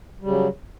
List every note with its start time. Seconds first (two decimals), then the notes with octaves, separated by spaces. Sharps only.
0.21 G3
0.25 C#3
0.28 F#3